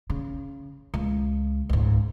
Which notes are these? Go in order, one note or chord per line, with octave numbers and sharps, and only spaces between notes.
C#3
C#2
C#2 G#2